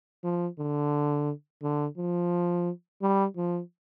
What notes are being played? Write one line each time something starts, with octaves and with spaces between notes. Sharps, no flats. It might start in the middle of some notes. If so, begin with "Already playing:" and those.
F3
D3
D3
F3
G3
F3